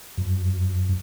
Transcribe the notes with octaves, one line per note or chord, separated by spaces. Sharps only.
F#2